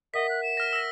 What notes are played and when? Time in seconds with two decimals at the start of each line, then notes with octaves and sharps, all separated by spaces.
0.14 A#4 D#5 E5 F#5 B6
0.29 F#6
0.43 E7
0.57 F6 A#6
0.73 E6 A#6